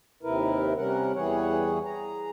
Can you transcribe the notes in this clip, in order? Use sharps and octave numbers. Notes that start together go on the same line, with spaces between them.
D#2 C3 E4 A#4 B4
C3 G3 C#4 A#4 F#5
E2 E3 G3 G#4 C#5 F#5
G#4 A#5